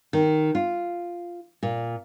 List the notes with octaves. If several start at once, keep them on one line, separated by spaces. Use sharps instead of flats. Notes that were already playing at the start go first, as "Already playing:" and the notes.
D#3
F4
A#2